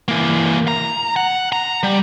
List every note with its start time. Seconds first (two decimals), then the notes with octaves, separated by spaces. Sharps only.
0.08 E3 A#3
0.68 A#5
1.16 F#5
1.52 A#5
1.83 G3